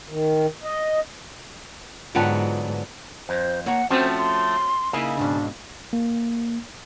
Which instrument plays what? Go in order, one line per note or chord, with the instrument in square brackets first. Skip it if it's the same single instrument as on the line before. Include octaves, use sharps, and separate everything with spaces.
[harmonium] D#3
D#5
[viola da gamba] G#2 [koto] D3 F#3 B3 [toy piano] F4 G5 A5
[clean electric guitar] F2 [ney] C5
[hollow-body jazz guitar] A#3 C#5 A#5 [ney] F#5
[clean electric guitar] F3 A3 [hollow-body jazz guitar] C4 C#4 F#4 [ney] C5
[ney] C6
[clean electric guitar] C#3 [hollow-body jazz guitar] A#3 D#4 E4
[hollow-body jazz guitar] C#2 G#2 B2 [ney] D4
[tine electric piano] A#3